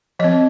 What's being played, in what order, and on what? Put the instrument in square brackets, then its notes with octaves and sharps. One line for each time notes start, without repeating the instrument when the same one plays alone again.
[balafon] F3 C4 D#5